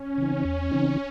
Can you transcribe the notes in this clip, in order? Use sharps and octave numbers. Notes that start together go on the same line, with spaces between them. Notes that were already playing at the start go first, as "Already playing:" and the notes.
Already playing: C#4
C#3 E3 C4 D#4
E2
C#3 E3 C4 D#4